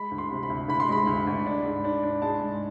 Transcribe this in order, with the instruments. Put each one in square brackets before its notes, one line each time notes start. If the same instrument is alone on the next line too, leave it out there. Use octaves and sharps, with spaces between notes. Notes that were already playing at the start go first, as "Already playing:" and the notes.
Already playing: [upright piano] G#3 B5
D2
C6
C3
B5
D2
D2 B5
C6
G#3 B5
D2
D2
D4
G#2
D4
D4
G#3 A5
G#2